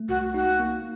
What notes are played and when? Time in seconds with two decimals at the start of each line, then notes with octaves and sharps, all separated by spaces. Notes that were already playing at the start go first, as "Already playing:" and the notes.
Already playing: A3
0.09 C2 F#4
0.34 D#4 F#4
0.60 A#3